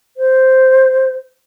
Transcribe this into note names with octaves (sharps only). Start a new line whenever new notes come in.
C5